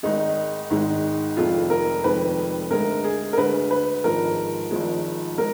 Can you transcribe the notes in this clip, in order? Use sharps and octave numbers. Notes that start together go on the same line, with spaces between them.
G#1 G#2 D#3 G#3 D#4
G#1 G#2 D#3 G#3
F1 F2 D#3 G#3 F4
A#4
F1 F2 D#3 G#3 B4
D2 D3 G#3 A#4
G#4
A#4
D2 D3 G#3 B4
B4
G#1 G#2 F3 G#3 A#4
G#1 G#2 F3 G#3
G#3 A#4